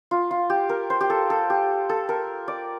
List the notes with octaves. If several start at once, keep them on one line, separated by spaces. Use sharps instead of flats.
F4
F4
G4
A#4
C5
G4
A4
A4
G4
A4
A#4
D5